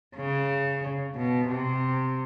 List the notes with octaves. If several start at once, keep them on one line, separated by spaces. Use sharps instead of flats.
C#3
B2
C3